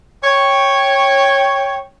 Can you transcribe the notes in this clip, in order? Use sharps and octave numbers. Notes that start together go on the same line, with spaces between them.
C#5 G5